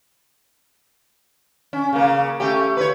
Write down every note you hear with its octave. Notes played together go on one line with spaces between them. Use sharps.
C#4
C#3 A#3
A3 C#4 G4
B4 C#5